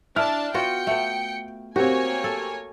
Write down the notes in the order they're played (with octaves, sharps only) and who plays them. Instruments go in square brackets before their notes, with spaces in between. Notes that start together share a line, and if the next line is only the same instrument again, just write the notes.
[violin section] D4 A5 [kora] E4 [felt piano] F6
[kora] B3 F4 F#4 [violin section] G5 C#7
[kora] A3 B3
[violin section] A#3 C#5 G#5 [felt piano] C4 G4 [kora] F#4
[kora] A4